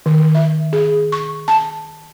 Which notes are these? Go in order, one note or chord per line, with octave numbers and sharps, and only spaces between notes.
D#3
E5
G#4
C#6
A5